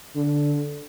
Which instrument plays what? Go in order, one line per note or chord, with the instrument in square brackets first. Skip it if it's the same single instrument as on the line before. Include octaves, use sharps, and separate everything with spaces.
[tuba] D3